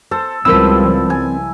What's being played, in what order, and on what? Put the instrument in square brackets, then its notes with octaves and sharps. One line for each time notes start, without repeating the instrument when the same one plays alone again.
[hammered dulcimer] A4 [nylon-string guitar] C5
[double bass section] C#2 F3 G3 [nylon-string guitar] C4 A#4 B4 [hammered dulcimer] E4 [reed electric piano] E6
[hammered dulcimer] G#5